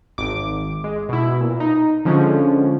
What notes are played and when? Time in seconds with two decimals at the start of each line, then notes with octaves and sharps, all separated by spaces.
0.18 G#1 D6
0.84 G#3
1.09 B2 E4
1.40 A#2
1.60 D#4
2.05 D3 F3 G#3 C#4